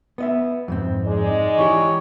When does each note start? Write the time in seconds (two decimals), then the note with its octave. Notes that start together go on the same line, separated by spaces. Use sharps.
0.18 B3 D#5 E5
0.68 F2 G#2 C4
1.07 G#3 D#4 D5
1.58 E3 G4 C#5